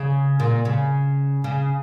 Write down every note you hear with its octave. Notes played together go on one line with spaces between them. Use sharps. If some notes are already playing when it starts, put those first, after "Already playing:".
Already playing: C#3
A#2
C#3
C#3